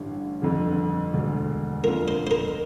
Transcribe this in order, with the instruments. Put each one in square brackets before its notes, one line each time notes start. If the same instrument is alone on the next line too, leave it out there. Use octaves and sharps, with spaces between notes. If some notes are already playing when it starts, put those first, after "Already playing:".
Already playing: [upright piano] A1 G2 D3
G1 F2 D3
E1 D2 D3
[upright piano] F2 D3 F3 A#3 F4 [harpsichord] A#4
[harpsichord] C5
C5
A#4